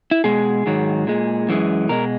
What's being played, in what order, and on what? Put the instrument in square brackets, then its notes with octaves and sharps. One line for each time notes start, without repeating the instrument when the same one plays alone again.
[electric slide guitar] E4
B2 G#3 G#4
G#2 D#3 F#3
A#2 G#3
F#2 E3 G#3
B2 G#3 A#4